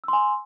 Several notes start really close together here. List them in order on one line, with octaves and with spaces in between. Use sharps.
E6 C6 G#5